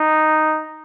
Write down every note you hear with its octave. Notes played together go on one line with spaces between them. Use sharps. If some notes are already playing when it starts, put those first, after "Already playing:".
Already playing: D#4